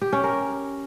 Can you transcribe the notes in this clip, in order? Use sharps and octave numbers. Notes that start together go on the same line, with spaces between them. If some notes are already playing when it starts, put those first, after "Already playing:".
G4
C#4
A#4